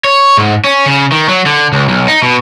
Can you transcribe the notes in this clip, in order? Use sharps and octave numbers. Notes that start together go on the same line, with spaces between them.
C#5
G#2
C#4
C#3
D#3
F#3
D3
C#2
B1
D#4
B2